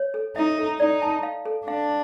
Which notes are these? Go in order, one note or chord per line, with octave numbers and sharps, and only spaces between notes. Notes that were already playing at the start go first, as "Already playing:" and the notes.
Already playing: C#5
A4
D#4 E5
A4
D#4 D5
A5
F5
A4
D4 F5